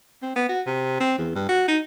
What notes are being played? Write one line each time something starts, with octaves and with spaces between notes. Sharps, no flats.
C4
B3
F#4
C3
C4
E2
G2
F#4
D#4